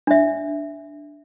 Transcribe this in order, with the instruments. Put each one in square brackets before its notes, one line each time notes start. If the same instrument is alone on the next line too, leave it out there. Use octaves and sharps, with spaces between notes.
[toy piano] D4 E5